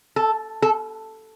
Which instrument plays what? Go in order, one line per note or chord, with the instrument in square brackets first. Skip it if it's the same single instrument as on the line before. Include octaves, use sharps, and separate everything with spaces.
[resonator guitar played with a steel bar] A4
A4